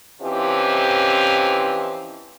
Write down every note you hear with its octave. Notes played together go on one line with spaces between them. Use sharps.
E3 F3 C4 C#4 D#4 G4